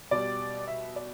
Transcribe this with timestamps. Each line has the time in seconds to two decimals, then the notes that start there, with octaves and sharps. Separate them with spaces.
0.11 B2 G3 D5
0.68 E5
0.96 D5